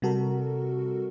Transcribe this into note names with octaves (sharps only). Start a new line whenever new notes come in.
C3 G3 F#4 A4 A#4